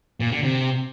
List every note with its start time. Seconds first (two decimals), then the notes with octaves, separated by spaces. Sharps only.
0.20 A#2
0.32 D3
0.43 C3